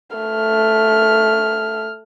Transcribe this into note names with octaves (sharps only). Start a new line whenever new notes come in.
A3 F6